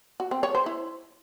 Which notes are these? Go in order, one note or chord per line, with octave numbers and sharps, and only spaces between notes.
F#4
C4
C#5
C5
E4